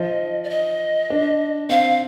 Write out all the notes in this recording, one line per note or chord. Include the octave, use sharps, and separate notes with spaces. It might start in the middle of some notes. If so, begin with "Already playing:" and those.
Already playing: F3 D#5
D5
D#5
D4
C4 F5